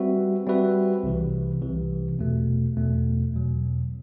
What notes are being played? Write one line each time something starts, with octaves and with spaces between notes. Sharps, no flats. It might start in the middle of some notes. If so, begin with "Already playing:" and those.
Already playing: G3 C4 F#4 B4 E5
G3 C4 F#4 B4 E5
C2 C3 E3
C2 C3 E3
E2 B2 A3
E2 B2 A3
E2 B2 F#3